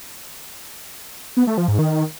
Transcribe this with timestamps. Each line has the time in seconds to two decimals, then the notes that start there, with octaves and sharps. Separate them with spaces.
1.37 B3
1.47 A3
1.58 F3
1.68 G#2
1.79 D#3